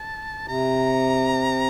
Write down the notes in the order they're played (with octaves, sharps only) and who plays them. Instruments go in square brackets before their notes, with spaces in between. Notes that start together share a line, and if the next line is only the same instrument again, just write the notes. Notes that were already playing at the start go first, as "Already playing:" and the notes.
Already playing: [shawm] A5
[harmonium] C3 [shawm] A#5